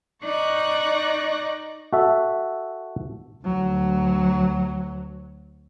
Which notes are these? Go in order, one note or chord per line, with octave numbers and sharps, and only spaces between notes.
D#4 D5 C#6 F#6 A#6
F#4 A4 E5
D2 F#3